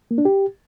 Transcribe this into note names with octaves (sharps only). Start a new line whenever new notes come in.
A#3
D4
G4